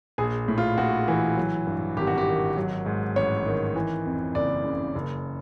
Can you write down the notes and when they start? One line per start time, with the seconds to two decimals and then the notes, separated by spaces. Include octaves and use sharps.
0.18 A#1 G#4
0.48 A2
0.58 F4
0.77 A#1 F#4
1.08 E3
1.37 F#3
1.67 G2
1.97 G#1 G4
2.07 F#4
2.18 G4
2.27 D#3
2.57 F#3
2.86 G#2
3.16 A1 C#5
3.46 D#3
3.75 E3
4.05 F2
4.35 F#1 D5
4.65 C#3
4.95 F#1